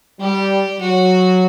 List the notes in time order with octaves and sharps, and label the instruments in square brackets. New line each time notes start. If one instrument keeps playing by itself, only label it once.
[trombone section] G3 [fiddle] G4
[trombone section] F#3 [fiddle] F#4